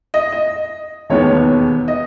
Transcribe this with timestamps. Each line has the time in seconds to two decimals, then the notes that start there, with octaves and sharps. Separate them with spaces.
0.14 D#5
0.32 D#5
1.10 E1 D#2 D#3 G#3 B3 C#5
1.88 D#5